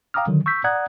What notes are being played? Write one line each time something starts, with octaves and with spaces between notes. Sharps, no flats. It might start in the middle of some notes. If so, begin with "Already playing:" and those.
F5 G5 A#5 D6 D#6 F6
D3 D#3 F#3
C#6 E6 G6 B6
D5 F#5 A#5 D#6 F#6 G#6